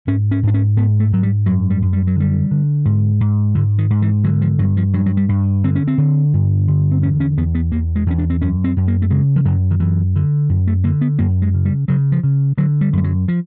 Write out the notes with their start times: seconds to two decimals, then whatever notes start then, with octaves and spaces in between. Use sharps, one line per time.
0.07 G#2 C#4
0.31 C#4
0.43 G#2 D4
0.54 C#4
0.77 G#2 B3
1.00 A3
1.12 G#2 F#3
1.23 G3
1.46 F#2 F#3
1.70 G3
1.82 F#2
1.93 G3
2.07 F#3
2.16 D3 G3
2.51 D3
2.85 G#2
3.21 G#2
3.55 G#2 D3
3.78 D#3
3.90 G#2
4.02 E3
4.24 D3 F#3
4.41 F3
4.59 G2 F#3
4.77 F3
4.93 G2 F#3
5.06 F#3
5.17 G3
5.29 G2
5.64 D3 C4
5.76 C#4
5.88 C4
5.98 D3
6.34 G2
6.68 D3
6.92 C4
7.02 E2 C#4
7.20 C#4
7.37 E2 B3
7.55 B3
7.71 E2 A#3
7.96 G#3
8.06 E2 C#4
8.18 D4
8.30 C4
8.41 F#2 C#4
8.64 C4
8.77 F#2
8.88 A#3
9.02 A3
9.10 C#3 G#3
9.36 F3
9.45 F#2 F#3
9.71 D#3
9.80 F#2 E3
10.16 D3
10.49 F#2
10.67 A3
10.84 D3 A#3
11.01 B3
11.19 F#2 A#3
11.42 G#3
11.54 C#3
11.65 G3
11.88 C#3 F#3
12.12 F3
12.23 C#3
12.58 D3 F#3
12.81 G3
12.93 F#2 G3
13.04 F#3
13.28 F3